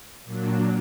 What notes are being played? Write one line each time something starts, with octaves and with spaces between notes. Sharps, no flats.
A#2 F#3 D4